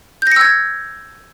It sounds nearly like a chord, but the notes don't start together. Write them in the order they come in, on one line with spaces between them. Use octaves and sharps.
G6 A#6 C#7 E6 G#6